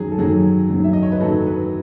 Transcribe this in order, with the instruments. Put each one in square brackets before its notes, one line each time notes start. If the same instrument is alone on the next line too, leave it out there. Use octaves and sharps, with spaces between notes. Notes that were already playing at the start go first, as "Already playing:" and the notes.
Already playing: [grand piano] F#2 D#3 F#3 G#4
A4
F#2 D#3 F#3 G#4
F#2 D#3 F#3
E5
D#5
C#5
B4
F#2 D#3 F#3 A4
B4